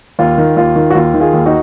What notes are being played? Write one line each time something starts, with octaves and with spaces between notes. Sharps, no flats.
D#2 F4
D#3
D#2 F4
D#3
F#4
D#2 F4
D#3
F4 G#4
D#2
D#4 F#4